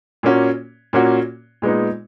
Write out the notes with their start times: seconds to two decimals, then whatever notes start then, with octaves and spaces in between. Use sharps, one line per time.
0.23 A#2 A#3 C#4 F#4
0.93 A#2 A#3 C#4 F#4
1.62 A#2 G#3 B3 D#4